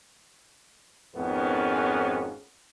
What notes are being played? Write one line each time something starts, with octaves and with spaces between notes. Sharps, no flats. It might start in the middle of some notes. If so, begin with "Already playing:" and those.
G#1 F2 G#2 B3 C#4 A#4